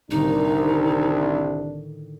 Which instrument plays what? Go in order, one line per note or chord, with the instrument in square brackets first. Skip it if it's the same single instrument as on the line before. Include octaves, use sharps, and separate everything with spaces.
[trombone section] C2 D4 [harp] A2 D3 D#3 [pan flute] D#4